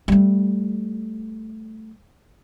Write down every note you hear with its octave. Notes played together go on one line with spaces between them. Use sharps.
G3 A3